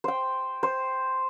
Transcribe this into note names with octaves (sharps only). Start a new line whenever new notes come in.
C5 G5
C5